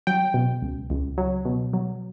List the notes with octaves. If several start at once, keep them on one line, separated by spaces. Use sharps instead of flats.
F#3 G5
B2
C#2
C#2
F#3
B2
F#3